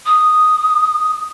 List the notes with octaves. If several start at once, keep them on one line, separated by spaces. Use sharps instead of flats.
D#6